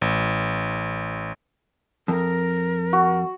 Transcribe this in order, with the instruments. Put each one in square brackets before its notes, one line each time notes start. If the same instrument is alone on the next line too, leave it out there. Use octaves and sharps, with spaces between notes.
[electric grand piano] A1
[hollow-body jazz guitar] F2 [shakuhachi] A#4
[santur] F#4